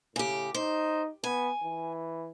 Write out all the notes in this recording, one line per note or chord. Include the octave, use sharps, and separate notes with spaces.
A2 C#3 G4
D#4 C5
B3 G#5
E3